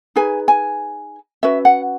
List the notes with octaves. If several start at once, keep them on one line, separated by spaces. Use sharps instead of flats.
D#4 G#4 B4 G#5
G#5
C#4 F#4 B4 E5
F#5